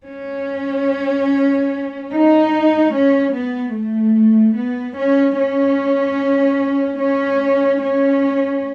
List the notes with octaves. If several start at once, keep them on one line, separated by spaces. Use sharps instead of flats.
C#4
D#4
C#4
B3
A3
B3
C#4
C#4
C#4
C#4